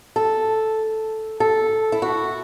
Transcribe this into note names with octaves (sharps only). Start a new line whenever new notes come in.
A4
A4
E4
F#4